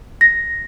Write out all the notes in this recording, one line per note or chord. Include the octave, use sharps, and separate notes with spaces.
A#6